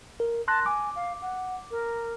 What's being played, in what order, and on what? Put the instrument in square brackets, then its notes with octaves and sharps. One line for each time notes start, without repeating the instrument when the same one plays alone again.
[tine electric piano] A#4
[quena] A5 [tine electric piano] C6 F#6 A#6
[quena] G#5 [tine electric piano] D6
[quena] F5
F#5
A#4